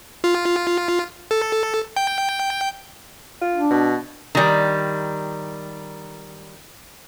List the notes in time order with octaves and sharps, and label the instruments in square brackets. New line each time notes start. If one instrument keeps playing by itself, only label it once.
[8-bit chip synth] F4
A4
G5
[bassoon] F4
[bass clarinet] D4
[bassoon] B2
[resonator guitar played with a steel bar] D#3 G3